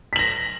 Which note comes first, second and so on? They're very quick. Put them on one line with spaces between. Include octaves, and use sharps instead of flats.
B6 F#7 A#6